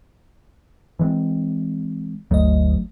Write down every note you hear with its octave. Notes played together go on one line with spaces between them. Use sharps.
E3 G#3 C4
G1 D2 F#3 A3 D#5